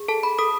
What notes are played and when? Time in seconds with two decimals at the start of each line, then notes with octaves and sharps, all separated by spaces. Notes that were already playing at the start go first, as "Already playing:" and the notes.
Already playing: G#4
0.08 A4 A5
0.23 B5
0.39 A4 D#6